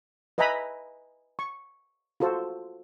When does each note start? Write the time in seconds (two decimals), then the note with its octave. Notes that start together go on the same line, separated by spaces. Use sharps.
0.38 B4 D#5 E5 G#5 A#5 B5
1.39 C#6
2.20 F4 F#4 A4 C5